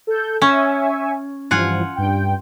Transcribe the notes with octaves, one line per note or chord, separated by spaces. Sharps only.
A4 G6
C#4 E5 G#5 C#6
G2 E3 F3 F4 F#5 G#5
G2 G5